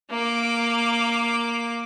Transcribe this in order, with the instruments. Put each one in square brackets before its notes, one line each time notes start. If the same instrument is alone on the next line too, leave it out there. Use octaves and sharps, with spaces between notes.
[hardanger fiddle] A#3 D6